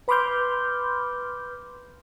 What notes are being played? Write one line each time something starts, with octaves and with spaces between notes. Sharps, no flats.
B4 B5 C6 D6 F6 G6